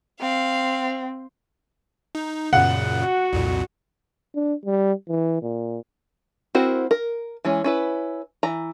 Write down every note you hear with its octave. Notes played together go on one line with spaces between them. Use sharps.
C4 F5
D#4
F#2 A#2 C#3 F#5
F#4
C2 F2 A#2
D4
G3
E3
A#2
C4 E4 F#4 A#4 C5
A#4
E3 G#3 C#4
C#4 E4 B4
E3 A#5